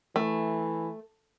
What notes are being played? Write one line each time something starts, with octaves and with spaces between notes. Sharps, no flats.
E3 A3